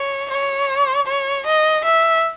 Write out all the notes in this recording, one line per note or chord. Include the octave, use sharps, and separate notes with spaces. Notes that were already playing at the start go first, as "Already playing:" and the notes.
Already playing: C#5
C#5
C#5
D#5
E5